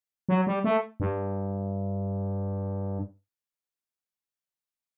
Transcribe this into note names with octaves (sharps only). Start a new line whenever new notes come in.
F#3
G3
A3
G2